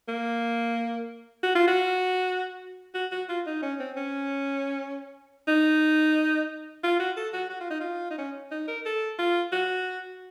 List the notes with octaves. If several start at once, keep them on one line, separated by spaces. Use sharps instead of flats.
A#3
F#4
F4
F#4
F#4
F#4
F4
D#4
C#4
C4
C#4
D#4
F4
F#4
A4
F#4
F#4
F4
D#4
F4
D#4
C#4
D#4
A#4
A4
F4
F#4